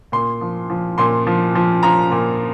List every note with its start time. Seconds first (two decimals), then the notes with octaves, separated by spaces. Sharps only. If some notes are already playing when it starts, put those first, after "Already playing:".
0.12 A#2 C6
0.41 F3
0.70 F3
0.98 A#2 C6
1.27 F3
1.55 F3
1.83 F3 A#5
2.12 A#2